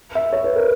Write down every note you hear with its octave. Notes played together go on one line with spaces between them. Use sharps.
E5
C#5
B4
A#4